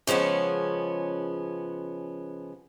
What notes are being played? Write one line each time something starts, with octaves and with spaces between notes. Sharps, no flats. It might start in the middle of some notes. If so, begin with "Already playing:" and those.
C#3 F3 G#3 B3 C#4